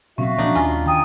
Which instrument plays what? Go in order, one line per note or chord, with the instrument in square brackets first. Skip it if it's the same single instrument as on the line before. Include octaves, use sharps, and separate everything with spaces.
[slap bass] B2 F#3 C4 [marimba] C#4 [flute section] F#4 E5 F5
[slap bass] A#2 F3 F#3 [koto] D4 D#4
[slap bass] D#2 [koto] F4 [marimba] G#5
[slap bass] D#3 [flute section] G5 G#5 [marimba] A#5 D#6